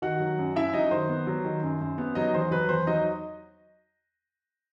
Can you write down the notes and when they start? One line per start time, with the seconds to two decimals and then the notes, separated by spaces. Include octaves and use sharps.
0.02 D#3 F#4 F#5
0.20 F#3
0.39 F#2
0.55 F#2 E4 E5
0.73 F#3 D#4 D#5
0.91 D#3 C5
1.09 B3
1.27 F#3
1.45 D#3
1.63 F#2
1.81 F#2
1.98 B3
2.15 F#3 D#4 D#5
2.34 E2 C5
2.51 F#3 B4
2.69 E2 C5
2.87 F#3 D#4 D#5